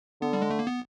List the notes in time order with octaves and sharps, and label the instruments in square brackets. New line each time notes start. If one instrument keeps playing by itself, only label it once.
[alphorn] D3 [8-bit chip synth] B3
[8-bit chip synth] G3
G#3
A3
A#3
B3